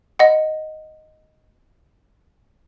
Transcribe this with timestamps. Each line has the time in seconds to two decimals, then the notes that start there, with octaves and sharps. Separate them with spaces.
0.19 D#5 F#5